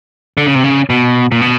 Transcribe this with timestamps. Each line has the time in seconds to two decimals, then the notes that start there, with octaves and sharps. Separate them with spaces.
0.37 D3
0.47 C#3
0.55 C3
0.64 C#3
0.90 B2
1.32 A#2
1.41 B2